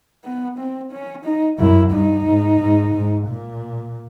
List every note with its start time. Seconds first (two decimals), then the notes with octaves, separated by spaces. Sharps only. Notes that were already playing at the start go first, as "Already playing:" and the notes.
0.24 B3
0.58 C4
0.91 C#4
1.25 D#4
1.59 F#2 E4
1.92 G2 D#4
2.26 G#2
2.60 G#2
2.94 G#2
3.27 A#2